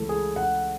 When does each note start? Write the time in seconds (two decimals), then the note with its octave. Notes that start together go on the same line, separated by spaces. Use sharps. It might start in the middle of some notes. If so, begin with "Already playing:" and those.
Already playing: C#2 C#3 E3 A3
0.09 G#4
0.36 F#5